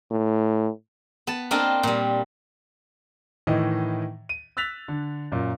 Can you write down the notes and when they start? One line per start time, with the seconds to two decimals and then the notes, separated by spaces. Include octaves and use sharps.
0.11 A2
1.27 B3 A5
1.51 A#3 C4 D4 F4 D#5 A#5
1.83 A#2 G3
3.47 A2 D#3 E3 D#5
4.29 D#7
4.57 E6 F#6 A6 B6 F7
4.88 D3
5.32 F#2 A#2